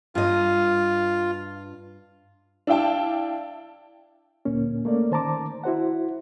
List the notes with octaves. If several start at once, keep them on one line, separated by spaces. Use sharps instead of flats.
G2 F4 D#5
D4 E4 F5 G5 A5
D2 A#2 A#3 C#4
A3 A#3 C#4 D5
D#3 C5 A5 A#5 D6
E4 F#4 C5 F#5